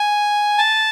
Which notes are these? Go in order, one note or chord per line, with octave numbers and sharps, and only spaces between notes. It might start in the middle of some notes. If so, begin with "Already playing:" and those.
Already playing: G#5
A5